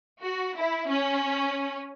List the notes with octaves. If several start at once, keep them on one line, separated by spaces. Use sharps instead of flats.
F#4
E4
C#4